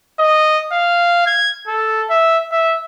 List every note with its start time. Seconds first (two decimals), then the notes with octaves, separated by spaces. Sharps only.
0.19 D#5
0.72 F5
1.27 G#6
1.68 A4
2.10 E5
2.52 E5